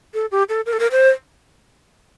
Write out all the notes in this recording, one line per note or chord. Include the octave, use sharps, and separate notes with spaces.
A4
G4
A4
A#4
A4
A#4
C5